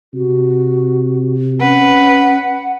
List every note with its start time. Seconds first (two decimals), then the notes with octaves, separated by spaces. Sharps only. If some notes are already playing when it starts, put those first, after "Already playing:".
0.14 C3 F#4
1.61 C#4 B4 F#5